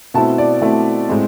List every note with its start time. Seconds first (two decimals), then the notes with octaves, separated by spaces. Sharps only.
0.14 B2 A3 C4 E4 A5
0.38 D5
0.61 B2 A3 C4 E4
1.08 A2 G#3 C4